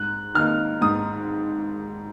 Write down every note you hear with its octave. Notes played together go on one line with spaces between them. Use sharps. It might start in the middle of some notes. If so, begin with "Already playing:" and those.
Already playing: G#2 F#6
D#3 A#3 D#4 F6
G#2 D#6